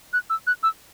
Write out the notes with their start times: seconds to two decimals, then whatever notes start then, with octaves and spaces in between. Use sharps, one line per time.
0.13 F#6
0.30 E6
0.47 F#6
0.63 E6